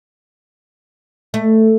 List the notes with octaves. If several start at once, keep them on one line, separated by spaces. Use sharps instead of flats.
A3